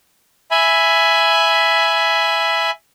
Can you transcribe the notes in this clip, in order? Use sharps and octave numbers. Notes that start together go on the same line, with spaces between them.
E5 G#5 B5